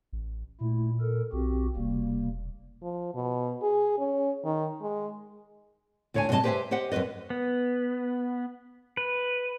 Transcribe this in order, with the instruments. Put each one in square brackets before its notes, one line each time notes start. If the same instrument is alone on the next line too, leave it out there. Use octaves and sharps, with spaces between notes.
[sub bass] A1
[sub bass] A#2 [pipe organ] A3 E4
[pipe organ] A4 A#4
[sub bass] B1 [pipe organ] C4 F#4 G4
[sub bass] E1 [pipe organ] C3 G3 A#3
[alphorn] F3
B2
G#4
C#4
D#3
G#3
[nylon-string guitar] D2 D4 C#5 G5 G#5
G2 C3 F#3 F4 D#5 A5
G4 B4 C5 D#5 E5 G#5
G4 C5 D#5 F#5
F#2 C4 G4 B4 D#5
[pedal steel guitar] B3
B4